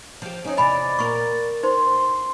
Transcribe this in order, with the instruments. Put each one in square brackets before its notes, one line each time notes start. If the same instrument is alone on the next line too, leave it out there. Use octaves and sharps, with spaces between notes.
[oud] F3 G4
[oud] C4 C#4 [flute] D#4
[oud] E2 C3 [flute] D5 [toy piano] D#5 G#5 B5
[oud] A#2 A#4 [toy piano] C#6
[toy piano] D#4 C5 [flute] C6